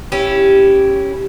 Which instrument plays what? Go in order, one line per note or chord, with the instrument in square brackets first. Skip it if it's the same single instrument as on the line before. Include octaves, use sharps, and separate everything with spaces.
[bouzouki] C#4 E4 G4